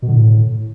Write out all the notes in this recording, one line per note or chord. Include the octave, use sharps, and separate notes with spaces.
B2
D3
A2